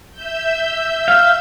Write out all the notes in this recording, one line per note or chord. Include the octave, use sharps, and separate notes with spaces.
E5 E6 G6
F5